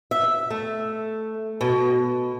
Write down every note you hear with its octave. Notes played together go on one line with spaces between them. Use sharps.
E5
A3
B2